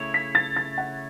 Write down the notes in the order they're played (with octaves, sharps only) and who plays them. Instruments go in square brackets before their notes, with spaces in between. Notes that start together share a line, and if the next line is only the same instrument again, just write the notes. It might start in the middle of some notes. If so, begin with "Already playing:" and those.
Already playing: [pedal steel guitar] C#3 A3 E4 C#5
[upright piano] B6
A6
A6
F#5